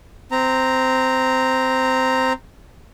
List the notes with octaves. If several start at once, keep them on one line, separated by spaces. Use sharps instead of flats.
C4 A#5